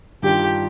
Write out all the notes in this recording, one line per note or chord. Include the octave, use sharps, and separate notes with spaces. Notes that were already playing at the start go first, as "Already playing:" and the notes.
G2 D#3 G3 D4 F4 G4